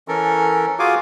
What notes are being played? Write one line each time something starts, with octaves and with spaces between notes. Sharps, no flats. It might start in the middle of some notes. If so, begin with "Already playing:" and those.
E3 C#4 A4 A#4
F4 F#4 G#4 F5 G#5 D6